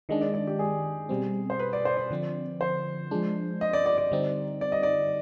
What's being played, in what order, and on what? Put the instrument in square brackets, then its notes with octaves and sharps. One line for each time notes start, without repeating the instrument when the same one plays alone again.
[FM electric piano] D#3 G#3 D4 [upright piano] D#5
[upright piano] D5
D5
G4
G#4
[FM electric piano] B2 G3 C4
[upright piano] C5
B4
D5
C5
D5
[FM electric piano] D3 F3 C4
[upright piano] C5
[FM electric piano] F3 G#3 D4
[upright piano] D#5
D5
D5
D5
[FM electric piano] D3 G3 C4 D#4
[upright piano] D5
D#5
D5